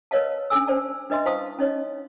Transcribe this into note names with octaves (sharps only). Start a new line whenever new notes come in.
A#4 B4 C#5 D#5 F5 A5
C#4 D4 A4 G#5 E6
C#4 C5 D5 A5
D4 B4 D#5 E5 C6
E4 C5 F5 A5 C#6 D#6
C#4 D#4 C#5 D#5